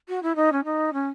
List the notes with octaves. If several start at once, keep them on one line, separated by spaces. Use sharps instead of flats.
F#4
E4
D#4
C#4
D#4
C#4